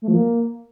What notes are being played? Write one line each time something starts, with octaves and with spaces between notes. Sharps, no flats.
A3
F3
A#3